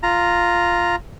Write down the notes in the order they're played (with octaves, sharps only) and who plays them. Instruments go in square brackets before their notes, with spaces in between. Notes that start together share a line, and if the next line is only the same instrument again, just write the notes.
[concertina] F4 A#5